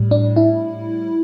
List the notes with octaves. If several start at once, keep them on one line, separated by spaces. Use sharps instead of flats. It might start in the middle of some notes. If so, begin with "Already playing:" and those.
Already playing: A2 G3
D4
E4